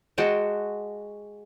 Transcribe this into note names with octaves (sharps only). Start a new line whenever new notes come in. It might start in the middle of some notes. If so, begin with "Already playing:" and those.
G#3 F#4 G5 A5